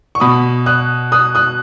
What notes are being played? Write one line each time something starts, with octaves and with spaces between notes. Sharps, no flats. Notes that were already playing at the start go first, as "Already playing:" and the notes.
C#6
B2 B5 D#6
D#6 F#6
D#6 F#6
D#6 F#6